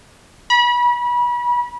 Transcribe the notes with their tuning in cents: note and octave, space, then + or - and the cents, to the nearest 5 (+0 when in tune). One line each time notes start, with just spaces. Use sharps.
B5 -30